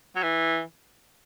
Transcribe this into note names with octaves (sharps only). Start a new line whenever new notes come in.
F#3
E3